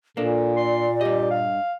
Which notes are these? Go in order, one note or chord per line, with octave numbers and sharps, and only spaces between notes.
A#2 A#3 D4 A4
D5 C6
G2 G4 D#5
F5